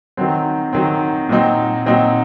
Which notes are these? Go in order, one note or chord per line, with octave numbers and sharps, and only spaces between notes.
D#3 F#3 C4
D#3 F#3 C4
A#2 F#3 C4 D#4
A#2 F#3 C4 D#4